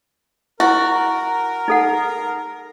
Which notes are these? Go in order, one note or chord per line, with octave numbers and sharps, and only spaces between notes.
E4 F#4 A#4
D#4 A4 F#5